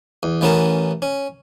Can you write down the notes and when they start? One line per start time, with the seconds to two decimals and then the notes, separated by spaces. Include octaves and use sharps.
0.23 E2
0.41 A1 E3 B3 C#4 A#4 A5
1.02 C#4